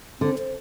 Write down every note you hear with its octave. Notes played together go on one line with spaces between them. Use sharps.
D3 C4
C5